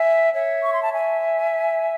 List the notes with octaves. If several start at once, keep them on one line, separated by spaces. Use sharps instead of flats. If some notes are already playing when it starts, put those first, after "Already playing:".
Already playing: E5 G#5
C#5 E5
C#6
C6
A5
E5 G#5